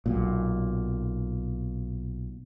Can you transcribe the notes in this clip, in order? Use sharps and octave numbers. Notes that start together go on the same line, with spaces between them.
B1 A#2